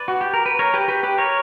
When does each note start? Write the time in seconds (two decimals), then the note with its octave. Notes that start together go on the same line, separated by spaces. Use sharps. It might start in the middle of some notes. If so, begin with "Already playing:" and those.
Already playing: B4 D5
0.08 F#4
0.21 G4
0.34 A#4
0.46 B4
0.59 A#4 C#5
0.74 G4 B4
0.88 G4 B4
1.03 G4 B4
1.18 A#4 C#5